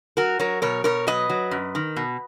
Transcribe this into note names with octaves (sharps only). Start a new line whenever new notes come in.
F#3 F#4 A#4
F#3 A#4 C#5
B2 A#4 C#5
B2 A#4 C#5
F#3 B4 D#5
F#3
F#2
D#3
B2